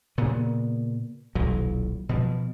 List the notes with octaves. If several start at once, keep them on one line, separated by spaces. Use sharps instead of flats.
A#2 C#3 B3
D#1 B1 E3 F#3
B2 F3